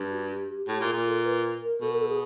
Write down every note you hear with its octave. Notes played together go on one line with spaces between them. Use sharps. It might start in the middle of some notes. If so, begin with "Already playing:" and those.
Already playing: G2
F#4
G4
G4
A2 G4
A#2
G#4
A#2
A4
B4
A#4
B2 A4
A#4
A4
G#4